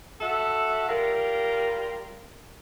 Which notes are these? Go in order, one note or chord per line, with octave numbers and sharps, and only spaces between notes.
F#4 A4 E5
G3 F4 A#4